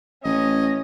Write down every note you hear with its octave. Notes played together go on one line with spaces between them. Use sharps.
A1 C#4 D#5